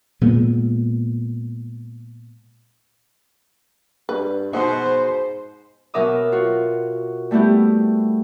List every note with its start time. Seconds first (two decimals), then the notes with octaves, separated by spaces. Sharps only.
0.21 A#2 G#3 B3
4.09 G2 B4
4.53 G#2 B2 D#4 C5 F#5
5.94 B2 F#3 A#4 E5 D6 D#6
6.32 F4 F#4
7.31 G3 A3 B3 E4 G4